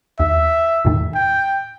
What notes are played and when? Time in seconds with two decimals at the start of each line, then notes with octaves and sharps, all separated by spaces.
0.19 D#2 E5
0.85 E2 A2 D#3
1.15 G5